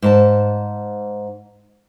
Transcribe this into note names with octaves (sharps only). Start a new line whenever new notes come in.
G#2 C5 A5